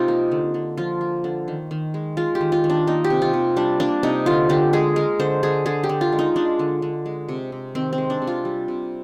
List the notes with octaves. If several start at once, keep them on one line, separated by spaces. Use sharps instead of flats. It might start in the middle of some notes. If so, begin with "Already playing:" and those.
Already playing: C3 D#4 F4
A#3
D3
D3
F3 F4
A#3
D3
D#3
D#3
G#3
G#3 F4
G4
D#3
F4
D#3
D4
A#3 D#4
G4
C3
F4
C3
G3 D4
A#3 D4
C3 D#4
D3 F4
D3 G4
G#3 G#4
G#3 A#4
D3 C5
D3 G#4
D3 G#4
G4
D3
F4
G#3
D#4
G#3 D4
D3
D3
G#3
C3
C3
D#3 C4
C4
G#3
D4
C3
F4
G3
C3